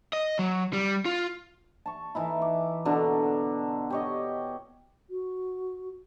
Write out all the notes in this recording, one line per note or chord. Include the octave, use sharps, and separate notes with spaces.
D#5
F#3
G3
F4
A5 C#6
E3 D#4 E4
D6
B2 D3 D4 A#5
G4 C#5 D#5
F#4